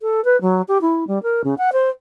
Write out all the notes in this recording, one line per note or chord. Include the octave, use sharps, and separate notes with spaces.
A4
B4
F#3
G4
E4
G3
A#4
C#3
F#5
C5